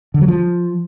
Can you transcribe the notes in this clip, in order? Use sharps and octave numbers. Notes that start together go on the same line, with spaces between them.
D3
F#3
F3